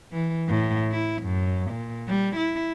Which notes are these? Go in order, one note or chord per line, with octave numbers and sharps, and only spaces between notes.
E3
A2
E4
F#2
A#2
G3
E4